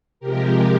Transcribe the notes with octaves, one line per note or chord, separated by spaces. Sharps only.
C3 F3 G#3 G4 A#4